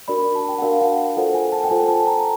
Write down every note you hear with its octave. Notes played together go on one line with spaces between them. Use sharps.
D4 F#4 A#4 D5 B5
B5
A5
G5
F#5
D4 F#4 A#4 D5 F5
F#5
F4 A4 C5 F#5
G#5
A5
G5
F4 A4 C5 G#5
A5
A#5